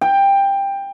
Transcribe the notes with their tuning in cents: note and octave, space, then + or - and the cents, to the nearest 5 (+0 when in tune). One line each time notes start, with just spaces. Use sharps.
G5 +15